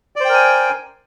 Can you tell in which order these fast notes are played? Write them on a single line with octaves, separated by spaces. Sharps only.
D5 C5 G5 A#4 G#5